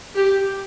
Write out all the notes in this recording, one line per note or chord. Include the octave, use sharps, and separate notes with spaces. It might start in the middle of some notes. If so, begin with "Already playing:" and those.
G4